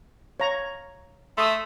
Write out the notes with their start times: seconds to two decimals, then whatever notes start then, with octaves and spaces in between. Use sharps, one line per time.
0.40 C#5 F5 A#5
1.37 A3 C6 D#6 E6